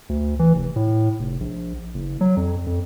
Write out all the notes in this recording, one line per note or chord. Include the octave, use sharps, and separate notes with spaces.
D2
E3
F1
A2
F1
A#1
F#1
F#3
F2
F2